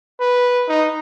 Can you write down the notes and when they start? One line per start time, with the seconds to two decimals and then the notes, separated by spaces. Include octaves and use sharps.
0.20 B4
0.69 D#4